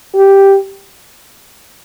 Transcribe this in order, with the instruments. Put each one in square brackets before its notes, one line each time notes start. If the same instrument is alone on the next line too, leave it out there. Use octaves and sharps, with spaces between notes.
[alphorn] G4